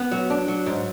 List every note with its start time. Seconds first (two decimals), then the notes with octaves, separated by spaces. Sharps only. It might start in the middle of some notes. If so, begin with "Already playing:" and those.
Already playing: B3
0.12 F#3
0.30 D4
0.48 F#3
0.66 G#2